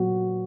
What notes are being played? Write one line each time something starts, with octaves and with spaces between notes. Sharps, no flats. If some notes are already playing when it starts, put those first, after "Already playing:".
Already playing: A#2 F#3 B3 F#4